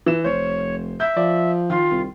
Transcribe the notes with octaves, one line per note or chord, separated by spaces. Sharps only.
E3 E7
F1 C5 C#5
E5 G6
F3 D5
D#3 F4
C2